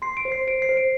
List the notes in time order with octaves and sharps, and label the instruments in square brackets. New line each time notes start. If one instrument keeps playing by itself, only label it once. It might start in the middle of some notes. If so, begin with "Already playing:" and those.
[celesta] C6 [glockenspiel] C7
[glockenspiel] D7
[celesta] C5
[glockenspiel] C7
[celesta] C5 [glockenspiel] D7
[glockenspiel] C7
[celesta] C5
[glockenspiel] D7